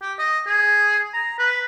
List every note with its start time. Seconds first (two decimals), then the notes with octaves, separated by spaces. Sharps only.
0.02 G4
0.19 D#5
0.47 G#4
1.14 A#5
1.39 B4